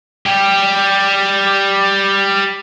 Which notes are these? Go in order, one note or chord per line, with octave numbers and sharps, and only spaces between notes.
G3 G4